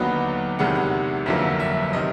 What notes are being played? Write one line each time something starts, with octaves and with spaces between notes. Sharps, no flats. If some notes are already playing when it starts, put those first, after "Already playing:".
Already playing: D#2 D3 F#3 B3 D#4
E2 C3 D#3 G#3 B3 F#5
F#5
G1 F2 D3 F#3 A#3 E5
E5
C3 D#3 D#5